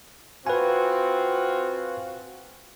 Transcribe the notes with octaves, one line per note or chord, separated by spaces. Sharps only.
C4 F4 F#4 B4 G#5